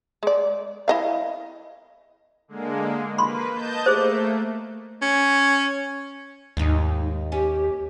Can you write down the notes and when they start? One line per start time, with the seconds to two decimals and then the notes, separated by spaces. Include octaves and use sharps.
0.23 G#3 D5
0.88 E4 D#5 F5
2.48 D3 G#3 A#3
3.18 A#3 B4 B5 C6
3.52 D#5 A5 G6
3.86 A3 A#3 G#4 C5
5.02 C#4
6.57 D#2 G#2 D#4
7.32 C#4 G4